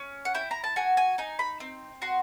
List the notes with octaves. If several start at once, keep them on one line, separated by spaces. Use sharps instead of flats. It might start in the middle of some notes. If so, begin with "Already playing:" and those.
Already playing: C#4
F#5
E4 G5
A#5
A5
F#4 G#5
G#5
D#4 G#5
B5
C4
F#4 C6